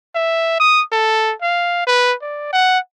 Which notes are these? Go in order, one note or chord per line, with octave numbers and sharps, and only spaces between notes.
E5
D#6
A4
F5
B4
D5
F#5